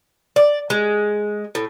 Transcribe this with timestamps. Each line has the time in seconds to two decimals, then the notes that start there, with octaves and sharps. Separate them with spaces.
0.36 D5
0.70 G#3
1.55 A2